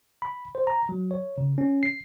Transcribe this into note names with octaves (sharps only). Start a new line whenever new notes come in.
B5
C5
A#5
F#3
C#5
C#3
C#4
C7